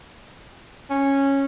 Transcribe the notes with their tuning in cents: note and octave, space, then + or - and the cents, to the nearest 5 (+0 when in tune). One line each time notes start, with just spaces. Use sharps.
C#4 -10